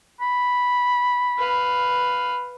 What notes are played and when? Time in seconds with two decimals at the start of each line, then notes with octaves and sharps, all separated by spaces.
0.21 B5
1.38 B4 F5